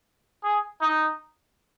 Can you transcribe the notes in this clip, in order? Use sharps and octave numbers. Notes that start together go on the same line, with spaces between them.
G#4
D#4